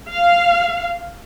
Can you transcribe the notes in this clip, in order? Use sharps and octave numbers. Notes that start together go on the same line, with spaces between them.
F5